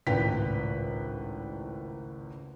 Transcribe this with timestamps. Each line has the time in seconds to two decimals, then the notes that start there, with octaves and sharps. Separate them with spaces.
0.07 G#1 C#2 A2 B4 G5 B6